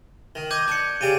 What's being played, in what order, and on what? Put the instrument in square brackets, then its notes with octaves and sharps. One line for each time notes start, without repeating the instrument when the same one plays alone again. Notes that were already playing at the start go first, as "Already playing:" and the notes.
[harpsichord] D#3
[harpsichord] D#5 [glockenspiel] D6 G6 G#6
[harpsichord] D4 [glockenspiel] G6 C#7
[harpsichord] C#3 G4 D5 [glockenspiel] D#7